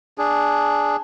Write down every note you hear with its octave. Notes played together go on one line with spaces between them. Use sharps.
D4 G#4